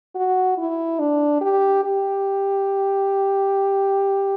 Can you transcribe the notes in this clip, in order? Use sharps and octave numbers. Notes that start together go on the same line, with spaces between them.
F#4
E4
D4
G4
G4